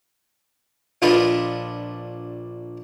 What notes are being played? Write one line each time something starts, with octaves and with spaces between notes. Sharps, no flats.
A#1 D4 F4 A4 B4 D#5